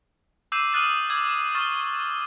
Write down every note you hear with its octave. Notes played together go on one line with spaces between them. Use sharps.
D6 E6 G6 C7 D#7 E7
D#6 F6 F#6 A6 D#7 F#7
D6 E6 G#6
E7
C#6 F6 A6 G7